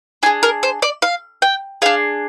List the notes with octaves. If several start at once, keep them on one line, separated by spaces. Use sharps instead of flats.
D4 G#4 G#5
A#4
C5
D5
F5
G5
D4 G#4 F5